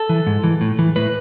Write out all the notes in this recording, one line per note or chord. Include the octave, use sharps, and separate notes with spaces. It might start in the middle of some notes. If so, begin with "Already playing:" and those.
Already playing: A4
E3
G#2
E3
A2
E3
A2 B4